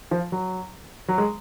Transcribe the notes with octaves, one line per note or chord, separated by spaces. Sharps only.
F3
F#3
F#3
G#3